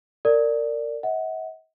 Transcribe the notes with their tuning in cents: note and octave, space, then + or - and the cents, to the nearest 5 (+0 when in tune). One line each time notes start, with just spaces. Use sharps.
A#4 -25 D5 +0
D#5 +45 F#5 +0